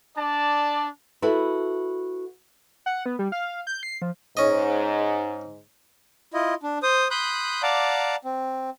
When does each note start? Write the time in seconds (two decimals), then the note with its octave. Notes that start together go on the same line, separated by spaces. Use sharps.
0.17 D4 D5 A5
1.22 E4 F#4 A4 B4
2.86 F#5
3.06 B3
3.19 G3
3.32 F5
3.67 G6
3.83 C7
4.02 F3
4.37 G#2 C#4 D#5
6.34 E4 F4 D#5
6.63 D4
6.83 C5 D#6
7.11 B5 C6 D#6 F#6 G6
7.63 D5 F5 F#5 A5 A#5 D6
8.24 C4